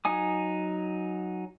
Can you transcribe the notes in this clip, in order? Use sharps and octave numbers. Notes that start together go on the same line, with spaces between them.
F#3 D#4 G#5 D#6